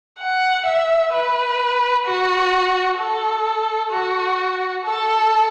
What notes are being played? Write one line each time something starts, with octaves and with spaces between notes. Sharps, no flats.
F#5
E5
B4
F#4
A4
F#4
A4